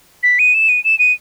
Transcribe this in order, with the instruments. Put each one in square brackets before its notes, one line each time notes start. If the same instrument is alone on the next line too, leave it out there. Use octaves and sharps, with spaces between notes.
[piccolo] B6
D#7
E7
D#7
E7
D#7